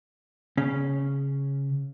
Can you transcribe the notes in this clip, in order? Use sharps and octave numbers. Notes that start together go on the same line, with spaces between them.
C#3 C#4